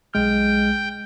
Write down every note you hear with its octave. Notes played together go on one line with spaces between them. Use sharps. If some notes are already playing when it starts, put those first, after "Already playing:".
B1 G#3 G5 F6